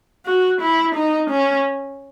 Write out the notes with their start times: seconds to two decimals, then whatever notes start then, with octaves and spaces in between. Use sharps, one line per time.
0.26 F#4
0.61 E4
0.95 D#4
1.30 C#4